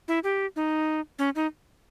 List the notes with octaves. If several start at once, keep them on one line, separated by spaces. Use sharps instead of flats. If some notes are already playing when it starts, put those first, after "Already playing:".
E4
G4
D#4
C#4
D#4